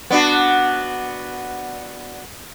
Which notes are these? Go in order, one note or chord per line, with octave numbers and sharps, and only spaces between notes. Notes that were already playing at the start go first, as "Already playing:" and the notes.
B3 D4 F#4